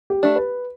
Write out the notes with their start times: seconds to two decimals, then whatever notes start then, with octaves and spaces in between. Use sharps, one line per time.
0.10 G4
0.23 A3 D4
0.36 B4